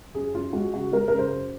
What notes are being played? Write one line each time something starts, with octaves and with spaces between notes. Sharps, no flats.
F#2 G#4
F#2 F4
G#3 F#4
C#3 F#4
G#3 A#4
C#3 A#4
C5
F#2